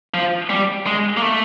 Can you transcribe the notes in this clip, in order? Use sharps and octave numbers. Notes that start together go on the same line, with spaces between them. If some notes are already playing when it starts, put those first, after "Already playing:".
F3
G3
G#3
A#3
A3